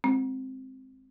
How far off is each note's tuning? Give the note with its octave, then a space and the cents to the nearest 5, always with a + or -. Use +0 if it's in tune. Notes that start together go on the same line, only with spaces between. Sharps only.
G#3 +0 C4 +0